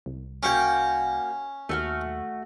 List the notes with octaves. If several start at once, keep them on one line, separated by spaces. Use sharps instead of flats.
C2
A#3 C#4 F#4 G5
D#2 A3 F#4 F6